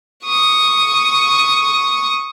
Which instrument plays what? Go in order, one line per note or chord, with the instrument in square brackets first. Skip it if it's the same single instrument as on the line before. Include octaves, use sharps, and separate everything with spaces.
[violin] C#6 D#6